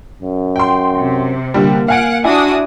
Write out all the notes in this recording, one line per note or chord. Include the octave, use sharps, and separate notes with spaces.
F#2
G5 C6
C3
D3 G3 A#3
F5 F#5 G#5 D7
D4 E4 F#4 G#5 D#6